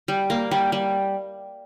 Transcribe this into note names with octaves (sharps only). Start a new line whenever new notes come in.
G3
A#3
G3
G3